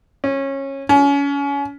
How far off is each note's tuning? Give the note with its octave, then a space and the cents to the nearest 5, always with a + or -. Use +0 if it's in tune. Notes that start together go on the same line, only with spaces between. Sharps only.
C#4 -20
C#4 +30